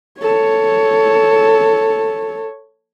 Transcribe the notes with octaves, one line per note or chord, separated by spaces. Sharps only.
A4 C#5